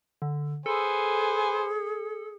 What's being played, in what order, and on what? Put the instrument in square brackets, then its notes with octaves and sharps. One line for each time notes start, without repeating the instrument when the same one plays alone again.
[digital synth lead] D3
[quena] G#4 [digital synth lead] A4 [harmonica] B4 C5 G#5